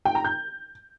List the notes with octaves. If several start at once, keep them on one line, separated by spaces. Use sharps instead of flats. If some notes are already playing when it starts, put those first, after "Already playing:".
G5
A#5
G6